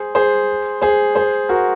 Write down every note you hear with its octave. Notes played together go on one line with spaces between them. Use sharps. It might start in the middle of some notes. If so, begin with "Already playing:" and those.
Already playing: G#4 C5
G#4 C5
G#4 C5
G#4 C5
F#4 A#4